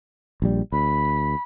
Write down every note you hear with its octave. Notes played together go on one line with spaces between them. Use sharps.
A#1 G3
D2 B5